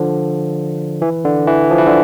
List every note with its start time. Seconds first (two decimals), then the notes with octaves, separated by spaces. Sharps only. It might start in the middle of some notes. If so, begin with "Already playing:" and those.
Already playing: D3 F3
1.02 E3
1.25 D3
1.47 E3
1.71 F3
1.78 E3
1.86 D3